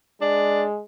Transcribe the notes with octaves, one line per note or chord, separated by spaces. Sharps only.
G#3 D4